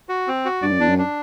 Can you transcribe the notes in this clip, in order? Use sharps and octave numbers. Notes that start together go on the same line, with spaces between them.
F#4
C4
F#4
G2 D5
F#2
E2 D4
F#2
D4